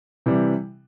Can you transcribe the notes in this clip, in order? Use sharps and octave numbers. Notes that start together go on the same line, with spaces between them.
C3 E3 G3